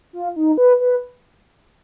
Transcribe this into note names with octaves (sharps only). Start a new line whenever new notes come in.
F4
D#4
B4
B4